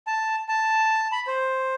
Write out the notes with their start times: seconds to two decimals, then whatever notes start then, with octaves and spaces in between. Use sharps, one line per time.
0.07 A5
0.48 A5
1.12 B5
1.27 C5